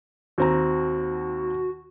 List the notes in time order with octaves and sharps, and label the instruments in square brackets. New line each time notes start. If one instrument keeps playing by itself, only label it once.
[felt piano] D#2 C4 A#5 [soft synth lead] F#4